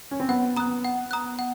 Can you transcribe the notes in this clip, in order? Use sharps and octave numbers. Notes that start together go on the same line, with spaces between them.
C#4
C4
B3 F#5
B3 A#5 D#6 F#6
F#5
A#5 D#6 F#6
F#5